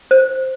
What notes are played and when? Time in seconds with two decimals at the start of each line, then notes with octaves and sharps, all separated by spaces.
0.11 C5